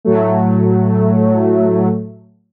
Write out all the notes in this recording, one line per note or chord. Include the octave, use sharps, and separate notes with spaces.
A2 F#3 A3